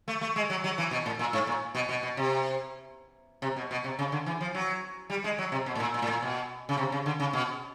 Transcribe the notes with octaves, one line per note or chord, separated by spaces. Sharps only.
A3
A3
G#3
F#3
F#3
E3
B2
A2
A#2
G#2
A#2
B2
B2
B2
C3
C3
B2
B2
C3
C#3
D3
E3
F3
F#3
G3
G#3
F#3
C3
B2
A2
A#2
A#2
A2
A#2
B2
C#3
C3
C#3
D3
C#3
B2